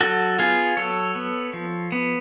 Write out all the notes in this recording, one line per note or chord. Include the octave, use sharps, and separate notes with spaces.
F#3 F#4 A4
B3 F4 G#4
F#3 A4 C#5
B3
F3
B3